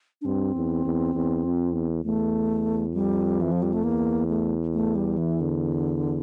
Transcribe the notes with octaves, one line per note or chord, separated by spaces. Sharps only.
D4
G2 C4
E2
E2
E2
F2
E2
E2 A3
F2 G3
E3
F3
G3
A3
E2 A#3
A3
A3
G3
E3
D3